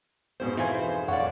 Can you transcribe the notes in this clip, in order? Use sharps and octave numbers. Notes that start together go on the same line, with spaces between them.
F2 G#2 B2 C5
E3 F4 G#5
F#2 C#5 D5 F5 F#5